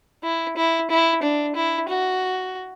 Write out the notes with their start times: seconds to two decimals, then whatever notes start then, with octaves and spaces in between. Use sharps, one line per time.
0.24 E4
0.57 E4
0.91 E4
1.23 D4
1.56 E4
1.88 F#4